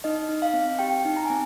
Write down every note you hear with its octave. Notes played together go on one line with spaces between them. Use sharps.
D#4 D#5
D#4
F5
C4
G4 G5
D#4
A#5
G#5
C4